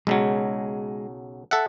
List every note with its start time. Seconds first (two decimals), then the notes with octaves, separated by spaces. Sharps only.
0.07 B1 C#3 F#3 G#3
1.51 A4 E5 F#5